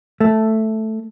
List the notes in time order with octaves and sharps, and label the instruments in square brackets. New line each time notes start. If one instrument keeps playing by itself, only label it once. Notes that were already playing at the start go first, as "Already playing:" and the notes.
[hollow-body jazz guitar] A3